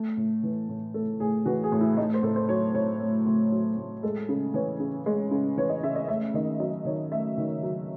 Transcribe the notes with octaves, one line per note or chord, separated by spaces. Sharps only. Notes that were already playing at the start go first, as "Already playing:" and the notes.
Already playing: A3
A2
E3
A2
A3 A4
A2 G#4
E3 F#4
G#4
A2
E4
A3 D#4
C5
A2 A4
C5
F#3 C#5
A2 C#5
A3
A2
F#3
A2
G#3 A4
C#3
E3 C#5
C#3
G#3
C#3
E3 C#5
D#5
C#3 E5
D#5
A3 E5
D#3 D#5
F#3 D#5
D#3 C#5
A3 E5
D#3
F#3